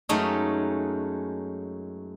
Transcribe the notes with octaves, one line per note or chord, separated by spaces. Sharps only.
F#2 G#3 A3 C#4 D#4